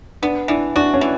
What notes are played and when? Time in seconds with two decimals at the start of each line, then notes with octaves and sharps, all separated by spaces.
0.22 B3 D4
0.48 E3 D4
0.76 D4 F#4
0.94 C#4
1.01 E3